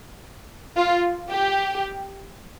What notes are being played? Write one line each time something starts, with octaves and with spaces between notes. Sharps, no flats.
F4
G4